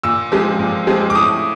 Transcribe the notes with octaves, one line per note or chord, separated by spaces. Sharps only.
A#2 E6
F3 G#3 C4
A#2
F3 G#3 C4
D6
A2 D#6